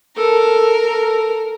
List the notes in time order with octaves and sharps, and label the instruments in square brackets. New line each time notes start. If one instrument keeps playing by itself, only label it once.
[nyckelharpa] A4 [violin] A#4
[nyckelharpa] A4